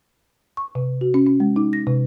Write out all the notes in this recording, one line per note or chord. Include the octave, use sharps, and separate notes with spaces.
C#6
C3
F#4
C#4
C#4
G#3
D#4
A#6
C3